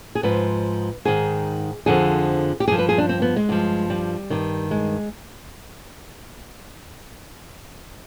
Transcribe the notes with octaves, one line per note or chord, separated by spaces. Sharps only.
G#4
G#2 F3 B4
G#2 D#3 G#4
F2 D3 F3 G#4
G4
G2 F3 G#4
B4
G#4
D4
C4
B3
G#3
G2 F3
G3
G2 D#3
G#3